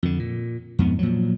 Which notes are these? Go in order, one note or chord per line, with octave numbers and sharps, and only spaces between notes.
F2 D3
A#2
F2 G#2 B3
A#2 F3 F#3